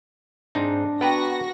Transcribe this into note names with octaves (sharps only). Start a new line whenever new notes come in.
G#2 C4 D4 D#4
B3 F#4 B4 G5 A#5 A#6